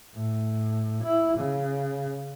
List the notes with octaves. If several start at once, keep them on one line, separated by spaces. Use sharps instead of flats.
A2
E4
C#3